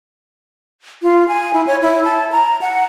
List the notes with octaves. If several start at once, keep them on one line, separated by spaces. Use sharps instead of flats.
F4
G#5
E4
C#5
E4
A5
A#5
F#5